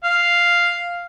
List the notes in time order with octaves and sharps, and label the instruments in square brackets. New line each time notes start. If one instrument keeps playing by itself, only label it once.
[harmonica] F5